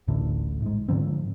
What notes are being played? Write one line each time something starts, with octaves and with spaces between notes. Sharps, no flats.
D1 A1 A2 D3
G#2 G#3
G#2 D3 F3 C4